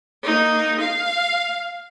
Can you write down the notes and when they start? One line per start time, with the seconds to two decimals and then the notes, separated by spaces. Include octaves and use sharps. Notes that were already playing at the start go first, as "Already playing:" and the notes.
0.23 A#3 D#4
0.80 F5